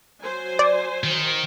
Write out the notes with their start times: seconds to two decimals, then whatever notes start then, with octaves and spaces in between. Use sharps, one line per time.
0.22 F#3 C5 G#5
0.59 D5
1.04 D#3